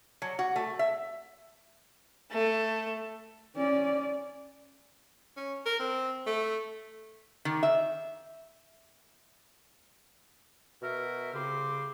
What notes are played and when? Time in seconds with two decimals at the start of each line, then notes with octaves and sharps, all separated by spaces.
0.22 F#3
0.39 F#4
0.56 A3
0.79 E5
2.31 A3
3.56 C#4 D5
5.37 C#4
5.65 A#4
5.79 C4
6.27 A3
7.45 D#3
7.63 E5
10.82 B2 F#4 A#4 E5
11.34 C2 C#3 C4 C6 D6